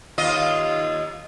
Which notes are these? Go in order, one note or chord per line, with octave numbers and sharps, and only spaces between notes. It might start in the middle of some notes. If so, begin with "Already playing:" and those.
D#2 F4 D#5